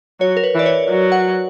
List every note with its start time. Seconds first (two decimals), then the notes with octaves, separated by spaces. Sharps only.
0.20 F#3 C#5
0.37 A#4
0.44 B4
0.55 E3 D5
0.66 C#5
0.90 F#3
1.12 F#5